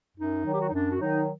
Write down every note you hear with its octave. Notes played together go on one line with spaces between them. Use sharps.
F#2 D#4
D#3 F#3
G4
F#4
D#4
F#2 D4
F#4
D#3 F#3 D#4